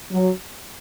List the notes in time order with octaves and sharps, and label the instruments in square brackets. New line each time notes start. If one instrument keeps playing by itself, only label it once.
[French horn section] F#3